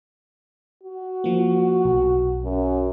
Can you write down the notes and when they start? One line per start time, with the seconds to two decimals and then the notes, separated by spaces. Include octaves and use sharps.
0.83 F#4
1.24 F3 A#3
1.85 B1
2.44 F#2